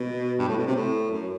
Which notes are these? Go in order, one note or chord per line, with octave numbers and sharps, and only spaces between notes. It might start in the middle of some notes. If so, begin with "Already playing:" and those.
Already playing: B2
G2
A2
B2
C3
A2
F#2